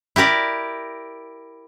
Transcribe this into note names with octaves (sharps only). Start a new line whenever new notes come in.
E4 G4 A#4 D5